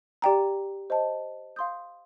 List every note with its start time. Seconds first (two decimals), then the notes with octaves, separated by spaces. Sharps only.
0.22 G4 D5 G5 A#5
0.90 C5 D#5 A5
1.56 F5 C6 D#6 G6